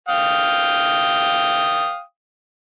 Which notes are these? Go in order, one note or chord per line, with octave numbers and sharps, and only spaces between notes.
F5 G5 D#6